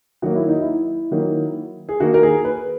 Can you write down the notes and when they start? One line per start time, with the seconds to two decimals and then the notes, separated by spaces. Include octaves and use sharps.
0.22 D#3 F#3 A#3 F#4
0.36 E4
0.48 D#4
0.62 E4
1.11 D#3 F#3 A#3
1.89 G#4
2.00 D#3 A#3 F#4
2.14 A#4
2.23 G#4
2.45 B4